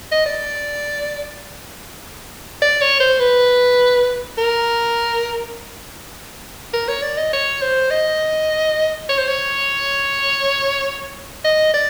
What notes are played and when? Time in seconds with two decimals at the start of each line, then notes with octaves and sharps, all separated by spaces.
0.12 D#5
0.26 D5
2.62 D5
2.81 C#5
3.00 C5
3.20 B4
4.38 A#4
6.74 A#4
6.88 C#5
7.02 D5
7.17 D#5
7.33 C#5
7.62 C5
7.91 D#5
9.09 C#5
9.18 C5
9.28 C#5
11.45 D#5
11.74 D5